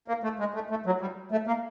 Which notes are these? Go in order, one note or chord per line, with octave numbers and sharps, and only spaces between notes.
A#3
A3
G#3
A3
A3
F#3
G3
A3
A#3